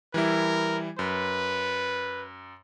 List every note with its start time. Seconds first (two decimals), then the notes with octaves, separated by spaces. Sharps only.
0.14 E3 G3 E4 A#4
0.99 F#2 B4